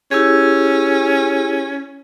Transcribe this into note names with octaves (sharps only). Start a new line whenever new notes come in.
C#4 E4 G4 G#4